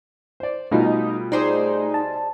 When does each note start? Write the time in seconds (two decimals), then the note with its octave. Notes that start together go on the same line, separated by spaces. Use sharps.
0.40 C5 D5
0.72 B2 G3 A3 B3 D#4 F4
1.32 D#4 G#4 C5 D5
1.94 A5